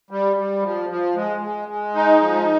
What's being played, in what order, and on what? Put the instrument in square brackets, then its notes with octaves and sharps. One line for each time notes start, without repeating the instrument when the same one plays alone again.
[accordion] G3
G3
F3
F3
G#3
G#3
G#3
D#4
F3